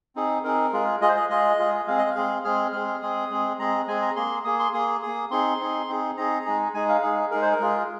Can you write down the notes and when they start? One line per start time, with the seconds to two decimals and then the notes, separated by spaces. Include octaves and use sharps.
0.15 C4 D#4 G#4
0.44 C4 D#4 G#4 A#4
0.73 G#3 F4 G#4
1.01 G#3 F4 G#4 D#5
1.09 C5
1.16 D#5
1.29 G#3 F4 G#4 D#5
1.59 G#3 F4 G#4
1.87 G#3 C4 G#4 F5
1.98 D#5
2.10 F5
2.15 G#3 C4 G#4
2.44 G#3 C4 G#4 F6
2.72 G#3 C4 G#4 F6
2.88 F6
3.02 G#3 C4 G#4 D#6
3.30 G#3 C4 G#4
3.59 G#3 C4 G#4 A#5
3.87 G#3 C4 G#4 G#5
4.02 A#5
4.16 A#3 G#4 C6
4.45 A#3 G#4 D#6
4.59 C6
4.74 A#3 G#4 D#6
5.02 A#3 G#4 D#6
5.30 C4 D#4 G#4 C6
5.59 C4 D#4 G#4
5.88 C4 D#4 G#4
6.17 C4 D#4 G#4 A#5
6.45 G#3 D#4 G#4
6.74 G#3 D#4 G#4 G#5
6.89 F5
7.02 G#3 D#4 G#4
7.31 G#3 D#4 G#4 A#4
7.42 C5
7.52 A#4
7.60 G#3 F4 G#4